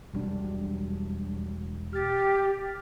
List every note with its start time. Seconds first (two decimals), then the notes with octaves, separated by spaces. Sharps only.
0.13 E1 F#3 G3 D4
1.93 G4 F6 A6